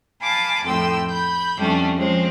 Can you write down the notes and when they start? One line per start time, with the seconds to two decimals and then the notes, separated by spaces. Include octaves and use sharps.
0.21 F5 G#5 A5 B5 D6
0.65 F2 A2 G5 C6 E6
1.09 B5 G6
1.57 F2 G3 A3 C#4 D4
1.98 F3 G#3 C4 C#4